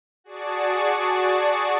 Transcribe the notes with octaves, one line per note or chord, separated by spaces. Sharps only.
F#4 G#4 D5 A5 C#6